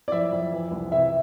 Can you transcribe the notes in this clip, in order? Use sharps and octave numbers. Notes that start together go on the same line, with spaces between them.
D5
F2 E4 E5
F2
E3
C2
C3 E4 E5